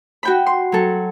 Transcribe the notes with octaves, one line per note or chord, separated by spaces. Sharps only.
F#4 G5 B5
C6
F#3 A4